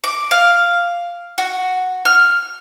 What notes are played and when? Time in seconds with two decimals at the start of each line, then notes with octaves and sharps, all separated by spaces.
0.04 D6
0.31 F5
1.38 F#4
2.05 F6